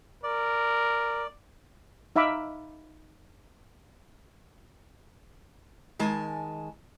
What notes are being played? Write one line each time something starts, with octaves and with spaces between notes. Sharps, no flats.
A#4 D5
D#4 E5 F5 B5 D6
D#3 G#3 G#5 A5